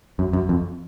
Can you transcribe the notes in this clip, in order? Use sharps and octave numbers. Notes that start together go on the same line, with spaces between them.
F#2
F#2
F2